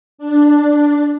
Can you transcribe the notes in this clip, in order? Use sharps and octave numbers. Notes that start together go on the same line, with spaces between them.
D4